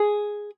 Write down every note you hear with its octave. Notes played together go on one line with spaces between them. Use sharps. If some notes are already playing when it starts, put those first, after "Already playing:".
Already playing: G#4